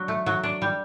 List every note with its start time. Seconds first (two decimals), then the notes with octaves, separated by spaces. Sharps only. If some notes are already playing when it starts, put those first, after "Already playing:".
Already playing: F#3 D4
0.08 A3
0.26 F#3
0.43 D4
0.62 G3